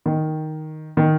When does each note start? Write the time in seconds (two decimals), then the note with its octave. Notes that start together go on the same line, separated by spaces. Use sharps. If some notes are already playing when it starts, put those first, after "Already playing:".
0.06 D#3
0.97 D#3